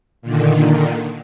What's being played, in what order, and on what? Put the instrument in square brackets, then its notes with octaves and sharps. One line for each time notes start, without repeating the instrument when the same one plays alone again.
[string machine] A#2 D3 D#3